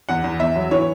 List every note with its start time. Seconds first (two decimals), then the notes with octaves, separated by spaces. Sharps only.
0.09 E2 F#5
0.24 E2
0.40 E2 E5
0.56 F#3
0.71 E3 C#5